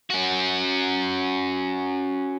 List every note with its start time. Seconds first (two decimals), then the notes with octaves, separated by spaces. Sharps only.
0.10 C#4 F#4